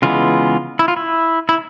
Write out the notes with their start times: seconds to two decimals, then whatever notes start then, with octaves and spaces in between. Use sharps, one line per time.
0.02 C#3 E3 G#3 B3 F4
0.79 E4
0.88 F4
0.97 E4
1.49 E4